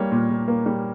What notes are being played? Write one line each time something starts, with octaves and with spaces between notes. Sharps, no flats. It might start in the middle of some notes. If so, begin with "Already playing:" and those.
Already playing: G3 A#3 C#5
A#2
A#2
A#3
G3